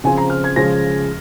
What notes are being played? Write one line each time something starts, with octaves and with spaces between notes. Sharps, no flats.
C#3 F3 C4 G#5
A#5
F6
G#6
C#3 F3 G#3 C#4 A#6